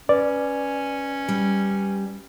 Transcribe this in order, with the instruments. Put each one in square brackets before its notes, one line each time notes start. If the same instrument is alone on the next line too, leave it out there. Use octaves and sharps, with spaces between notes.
[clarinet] C#4 [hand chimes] B4 [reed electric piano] D5
[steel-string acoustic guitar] G3